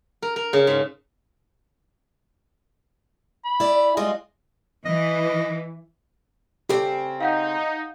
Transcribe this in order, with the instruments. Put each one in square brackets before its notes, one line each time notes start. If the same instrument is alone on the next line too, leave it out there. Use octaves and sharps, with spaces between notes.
[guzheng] A#4
A#4
C#3
G#2
[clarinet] B5
[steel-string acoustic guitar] E4 D5
[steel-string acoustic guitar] G3 G#3 F4 [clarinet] D#5
[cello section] E3 [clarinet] D#5
[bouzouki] C#3 C4 [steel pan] G4 A4
[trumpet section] D#4 [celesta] F5 F#5 G6